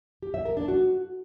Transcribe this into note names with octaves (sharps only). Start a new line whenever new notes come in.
G4
E5
A#4
D4
F#4